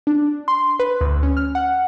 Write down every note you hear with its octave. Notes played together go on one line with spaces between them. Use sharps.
D4
C6
B4
D2
C#4
F6
F#5